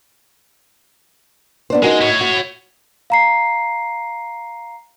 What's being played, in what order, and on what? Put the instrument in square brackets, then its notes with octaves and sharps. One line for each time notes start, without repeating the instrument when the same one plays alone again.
[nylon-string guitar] B3 D4 C5
[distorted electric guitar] G#3 [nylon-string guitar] D#4 F#4 A#4
[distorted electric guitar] E4 C#5
[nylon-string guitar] F#4
[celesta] F5 A#5 C7